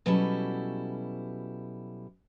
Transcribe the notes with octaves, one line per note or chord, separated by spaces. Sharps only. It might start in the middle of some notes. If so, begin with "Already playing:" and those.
B2 F#3 G3 C#4 E4 A4